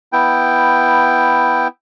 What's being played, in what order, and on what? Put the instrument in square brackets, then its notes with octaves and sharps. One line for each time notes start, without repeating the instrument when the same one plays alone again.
[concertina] B3 E4 G5